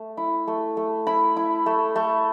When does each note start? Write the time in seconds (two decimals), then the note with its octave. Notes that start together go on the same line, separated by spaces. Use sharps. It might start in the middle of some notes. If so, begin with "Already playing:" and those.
Already playing: A3
0.17 E4
0.47 A3
0.77 A3
1.07 E4 B5
1.37 E4
1.66 A3
1.96 A3